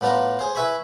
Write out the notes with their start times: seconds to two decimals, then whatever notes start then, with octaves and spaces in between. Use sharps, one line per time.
0.01 A2 B3 D4 F4 A#5
0.39 G#4 C5
0.55 E4 B4 E5 G#5 B5 C#6